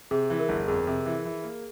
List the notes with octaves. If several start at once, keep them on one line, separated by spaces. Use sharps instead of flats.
C3 G#4
E3
A#4
G1
F2 G#4
C3
E3
E3
A#3